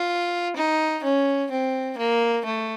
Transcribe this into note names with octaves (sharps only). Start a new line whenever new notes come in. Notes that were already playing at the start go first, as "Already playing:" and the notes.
Already playing: F4
D#4
C#4
C4
A#3
A3